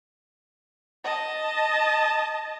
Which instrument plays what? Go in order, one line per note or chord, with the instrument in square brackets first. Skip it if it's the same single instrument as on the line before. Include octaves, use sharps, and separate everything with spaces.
[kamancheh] D#5 A5